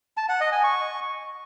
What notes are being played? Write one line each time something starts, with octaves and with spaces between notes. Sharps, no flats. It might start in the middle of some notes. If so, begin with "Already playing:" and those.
A5
F#5
D#5
G#5
C#6